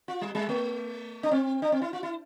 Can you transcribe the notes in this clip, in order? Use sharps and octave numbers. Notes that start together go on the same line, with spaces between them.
F4
G3
G3
A3
D4
C4
D4
C4
E4
F4
E4